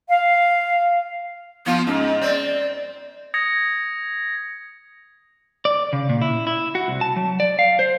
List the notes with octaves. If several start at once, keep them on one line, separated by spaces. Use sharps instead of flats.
F5
F3 B3 F4
G#2 C#4
C4 D5
D#6 G#6 A#6 C#7
D5
C#3
A#2
E4
E4
F#4
C2
A5
F#3
D5
F5
C5